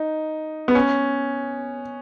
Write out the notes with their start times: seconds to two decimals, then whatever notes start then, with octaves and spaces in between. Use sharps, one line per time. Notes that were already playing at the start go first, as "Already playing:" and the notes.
Already playing: D#4
0.68 B3
0.75 C#4